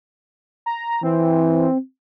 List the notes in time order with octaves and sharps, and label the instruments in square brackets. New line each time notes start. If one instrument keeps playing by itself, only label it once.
[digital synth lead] A#5
[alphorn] E3 [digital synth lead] C4